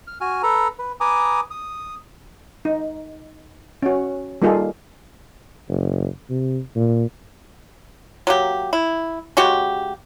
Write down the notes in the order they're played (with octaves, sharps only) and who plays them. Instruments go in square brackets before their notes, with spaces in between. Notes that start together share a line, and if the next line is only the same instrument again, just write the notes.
[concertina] F6
F#4 G#5 F6
A4 B4 A#5
B4
B4 G#5 A#5 D6 D#6
D#6
[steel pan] D#4
C#4 F#4
G3 A#3 D#4 F4 G#4 A4
[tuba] F#1
C3
A#2
[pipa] F#3 A#3 G4
E4
C#3 G#3 F#4 G4